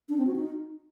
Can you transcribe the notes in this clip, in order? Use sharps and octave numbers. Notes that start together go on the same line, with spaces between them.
D4
C4
F#4
D#4